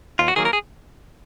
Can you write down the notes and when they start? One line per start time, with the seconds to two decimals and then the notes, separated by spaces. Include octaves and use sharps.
0.19 D#2 F4
0.28 F#4
0.36 D#3 F#3 A#3 G#4
0.45 A#4
0.53 G#4